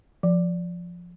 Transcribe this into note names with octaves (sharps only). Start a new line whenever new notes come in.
F3